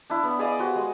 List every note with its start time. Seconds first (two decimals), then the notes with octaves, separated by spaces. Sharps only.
0.10 D4 E4
0.23 B3 C#5
0.39 G#4 D5 D#5 F5
0.59 F#4 G4 C5
0.76 G#3